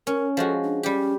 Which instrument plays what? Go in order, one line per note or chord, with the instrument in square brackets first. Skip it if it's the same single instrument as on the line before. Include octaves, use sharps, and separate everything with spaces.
[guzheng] C#4 [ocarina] A#4
[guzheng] F3 G#3 F#4 [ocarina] A4
[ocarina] D4
[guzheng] G3 G4 [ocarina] C#4